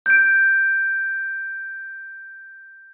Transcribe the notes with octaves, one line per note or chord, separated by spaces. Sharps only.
G6 D7